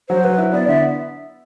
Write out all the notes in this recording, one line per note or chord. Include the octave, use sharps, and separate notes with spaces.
F#3 C5
F#3 B4
E4
B3 D5
D3 E5